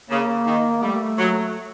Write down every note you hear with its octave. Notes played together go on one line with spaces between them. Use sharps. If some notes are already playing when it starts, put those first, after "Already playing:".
C#3 A#3
D#3
G3 A3
F#3